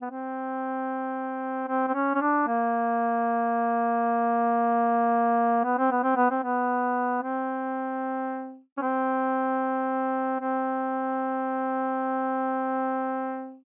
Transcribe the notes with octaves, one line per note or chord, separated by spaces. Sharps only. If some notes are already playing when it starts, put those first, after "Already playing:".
B3
C4
C4
C4
C#4
C#4
D4
A#3
B3
C4
B3
C4
B3
C4
B3
C4
C#4
C4
C4